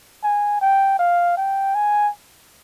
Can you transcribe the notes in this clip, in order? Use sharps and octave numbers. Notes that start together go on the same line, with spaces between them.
G#5
G5
F5
G5
G#5